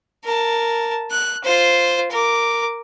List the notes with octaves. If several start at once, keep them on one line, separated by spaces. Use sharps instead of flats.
A#4 A5
F#6
F4 C5
A#4 D6